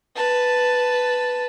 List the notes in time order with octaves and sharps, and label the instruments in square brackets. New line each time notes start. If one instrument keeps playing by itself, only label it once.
[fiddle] B4 A5